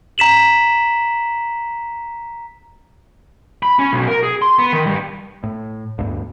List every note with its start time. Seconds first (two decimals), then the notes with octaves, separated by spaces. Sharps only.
0.18 A#5 B6 E7 F#7
3.63 B5
3.79 C#4
3.93 B1
4.08 A#4
4.23 G#4
4.42 C6
4.59 B3
4.72 D#3
4.86 G2
5.43 A2
5.99 D1 D2 G2